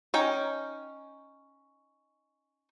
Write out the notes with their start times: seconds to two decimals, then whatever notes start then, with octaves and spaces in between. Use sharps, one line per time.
0.14 C#4 D#4 G5